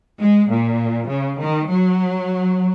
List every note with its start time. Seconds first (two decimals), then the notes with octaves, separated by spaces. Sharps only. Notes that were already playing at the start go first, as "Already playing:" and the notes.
0.21 G#3
0.51 A#2
1.10 C#3
1.40 D#3
1.70 F#3